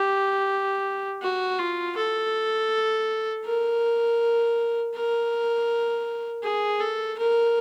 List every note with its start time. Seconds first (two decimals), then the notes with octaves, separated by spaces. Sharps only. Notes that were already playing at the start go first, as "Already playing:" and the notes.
Already playing: G4
1.22 F#4
1.59 F4
1.97 A4
3.46 A#4
4.95 A#4
6.44 G#4
6.81 A4
7.18 A#4